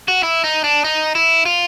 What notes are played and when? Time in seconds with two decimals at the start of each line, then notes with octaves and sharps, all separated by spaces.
0.08 F#4
0.23 E4
0.44 D#4
0.64 D4
0.84 D#4
1.15 E4
1.46 F4